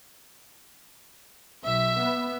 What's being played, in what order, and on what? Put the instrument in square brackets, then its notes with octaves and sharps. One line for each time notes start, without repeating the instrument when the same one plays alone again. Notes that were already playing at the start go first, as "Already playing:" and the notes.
[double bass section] B1 [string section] E5
[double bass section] B3